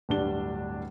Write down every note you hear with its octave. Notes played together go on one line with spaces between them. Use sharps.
D1 G2 G3 D4 G7